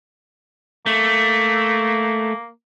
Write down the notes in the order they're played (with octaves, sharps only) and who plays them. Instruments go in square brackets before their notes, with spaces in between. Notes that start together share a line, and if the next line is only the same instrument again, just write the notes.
[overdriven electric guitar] A3 [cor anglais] A#3